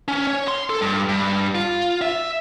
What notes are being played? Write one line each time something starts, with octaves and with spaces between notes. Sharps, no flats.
C#4
C#5
C6
A4
G2
G2
F4
E5